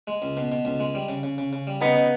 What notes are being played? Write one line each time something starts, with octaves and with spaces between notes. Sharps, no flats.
G#3
C#2
B2
B2
C#2
G#3
G3
C#3
C#3
C#3
C#3
G3
C#3 B3 D#4
C#3